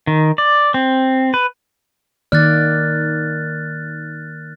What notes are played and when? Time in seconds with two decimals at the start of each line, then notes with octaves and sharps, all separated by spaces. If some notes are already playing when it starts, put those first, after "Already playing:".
0.07 D#3
0.38 D5
0.74 C4
1.34 B4
2.32 D#3 A#3 D5 F6 F#6 A6